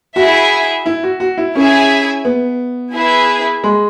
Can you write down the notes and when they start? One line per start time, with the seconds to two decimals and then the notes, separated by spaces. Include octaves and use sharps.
0.16 E4 F#4 G#4 E5
0.86 E4
1.03 F#4
1.20 F#4
1.38 E4
1.55 C#4 E4 G#4 E5 G#5
2.25 B3
2.94 E4 G#4 B4 E5
3.64 G#3